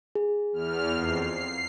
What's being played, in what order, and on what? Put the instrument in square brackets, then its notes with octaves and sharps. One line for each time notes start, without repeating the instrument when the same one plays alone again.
[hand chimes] G#4
[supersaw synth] E2 F6
F2 C7
C7